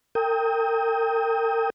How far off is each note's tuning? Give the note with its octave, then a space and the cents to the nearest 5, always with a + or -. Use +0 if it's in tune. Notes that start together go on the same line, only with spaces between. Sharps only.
A#4 -40 G5 +20 D#6 +30